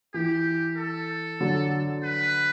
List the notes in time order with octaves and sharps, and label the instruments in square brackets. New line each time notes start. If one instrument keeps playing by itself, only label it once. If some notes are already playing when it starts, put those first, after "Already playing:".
[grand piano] E3 [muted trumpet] G4
[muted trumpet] A4
[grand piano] D3 F#3
[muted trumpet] B4